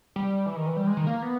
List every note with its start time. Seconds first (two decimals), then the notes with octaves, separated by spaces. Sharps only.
0.16 G3
0.46 E3
0.56 D#3
0.66 E3
0.77 G3
0.87 G#3
0.97 D#3
1.07 A#3
1.22 B3